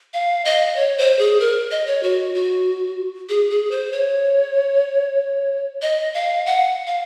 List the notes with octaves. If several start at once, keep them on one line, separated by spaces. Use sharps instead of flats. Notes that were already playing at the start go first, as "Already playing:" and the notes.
F5
D#5
C#5
C5
G#4
A#4
D#5
C#5
F#4
F#4
G#4
G#4
C5
C#5
D#5
F5
F#5
F5